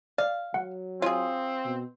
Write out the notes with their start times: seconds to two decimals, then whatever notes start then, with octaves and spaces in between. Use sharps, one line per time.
0.18 D5 F5
0.54 F#3 F#5
1.02 C4 F4 G#4 C#5
1.65 B2